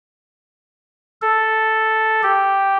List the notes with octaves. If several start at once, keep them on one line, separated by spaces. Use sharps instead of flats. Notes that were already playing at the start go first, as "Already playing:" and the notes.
A4
G4